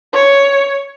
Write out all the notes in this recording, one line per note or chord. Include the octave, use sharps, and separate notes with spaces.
C#5